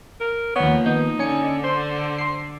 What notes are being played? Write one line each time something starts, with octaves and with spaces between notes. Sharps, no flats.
A#4
D#2 F3 A#3 B3 C#5
D#3 B3 D#4 G6
D3 C#4 G#5 C#7
C5 C6
C6 C7